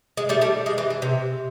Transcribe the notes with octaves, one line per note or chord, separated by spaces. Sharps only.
G#3
G3 A3
G3 A3
G#3
E3
E3
C3